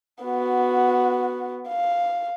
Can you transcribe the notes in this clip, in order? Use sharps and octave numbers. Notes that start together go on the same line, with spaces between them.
B3 F#4
F5